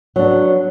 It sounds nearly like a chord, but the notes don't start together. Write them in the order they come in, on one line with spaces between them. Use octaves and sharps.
F#3 D4 B3